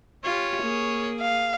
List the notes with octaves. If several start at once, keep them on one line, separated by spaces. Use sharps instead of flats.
C#4 F4 G4 C#5
A#3 G#4
F5